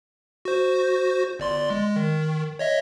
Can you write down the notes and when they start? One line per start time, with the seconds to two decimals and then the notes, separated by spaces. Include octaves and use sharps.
0.45 F#4 C5
1.39 G1 D5 C6
1.70 G#3
1.96 D#3
2.59 C#5 D#5 E5